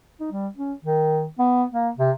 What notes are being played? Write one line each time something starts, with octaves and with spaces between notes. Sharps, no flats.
D#4
G3
C#4
D#3
B3
A#3
C3